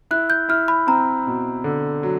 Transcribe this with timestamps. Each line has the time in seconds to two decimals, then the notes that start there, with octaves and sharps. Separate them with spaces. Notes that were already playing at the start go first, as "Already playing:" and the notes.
0.11 E4 F#6
0.30 G6
0.49 E4 F6
0.68 B5
0.87 C4 A#5
1.27 B2
1.64 D3
2.03 F#3